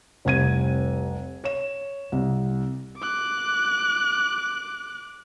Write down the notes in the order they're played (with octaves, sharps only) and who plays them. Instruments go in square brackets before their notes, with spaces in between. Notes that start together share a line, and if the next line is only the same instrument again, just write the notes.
[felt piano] F1 C2 G#6 D#7
C#5 E7
C2
[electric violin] D6 F#6